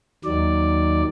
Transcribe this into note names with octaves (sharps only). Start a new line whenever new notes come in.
D#2 D#3 F#3 D5